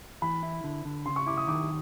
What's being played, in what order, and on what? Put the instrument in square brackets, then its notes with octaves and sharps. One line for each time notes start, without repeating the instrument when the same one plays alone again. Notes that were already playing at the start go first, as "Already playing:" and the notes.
[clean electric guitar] E3 [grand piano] B5
[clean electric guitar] E4
D3
D3
[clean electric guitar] C#3 [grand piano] C6
[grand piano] C#6
[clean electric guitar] E4 [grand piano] D6
[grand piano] D#6
[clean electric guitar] D#3 [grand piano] D6